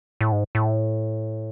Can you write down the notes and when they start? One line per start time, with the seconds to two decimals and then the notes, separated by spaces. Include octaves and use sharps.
0.21 A2
0.32 G#2
0.55 A2